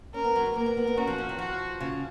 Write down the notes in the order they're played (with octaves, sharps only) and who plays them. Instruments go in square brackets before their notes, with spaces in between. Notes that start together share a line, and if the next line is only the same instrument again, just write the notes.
[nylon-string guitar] C#4 [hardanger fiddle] A#4
[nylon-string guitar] B3
F#3
G#3
[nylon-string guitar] A#3 [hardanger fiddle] A#4
[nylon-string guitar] B3
B3
B3
[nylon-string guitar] C#4 [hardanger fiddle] F#4
[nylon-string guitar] F3
F3
D#3
[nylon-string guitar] F3 [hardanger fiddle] F#4
[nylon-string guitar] C#3